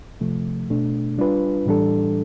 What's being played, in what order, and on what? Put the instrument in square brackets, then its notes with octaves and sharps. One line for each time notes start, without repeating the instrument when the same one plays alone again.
[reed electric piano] C3 F3 A3
B2 A3 D4
G3 D4 F4 B4
A2 E3 G3 D4 A4